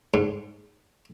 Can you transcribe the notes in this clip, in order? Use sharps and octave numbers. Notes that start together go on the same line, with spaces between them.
G#2